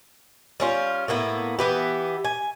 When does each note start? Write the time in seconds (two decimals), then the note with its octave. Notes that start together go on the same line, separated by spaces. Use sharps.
0.60 G3 C#4 F4
1.08 A2 A#3 B3 E4
1.59 E3 B3 G4
2.25 G#5